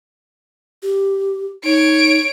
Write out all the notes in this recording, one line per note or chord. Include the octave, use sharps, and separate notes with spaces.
G4
D#4 C#5 D7